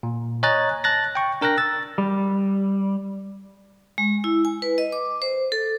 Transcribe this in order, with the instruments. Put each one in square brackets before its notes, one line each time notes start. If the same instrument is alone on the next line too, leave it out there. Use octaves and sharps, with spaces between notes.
[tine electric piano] A#2
C#5 D#5 G#5 A#5 F#6 A6
A5 F#6 A6 A#6
G5 C#6
D4 A#4 G5 F#6 A#6
E6 A6
[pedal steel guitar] G3
[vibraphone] G#3
E4
G#5
B4
D#5
D6
C5
A4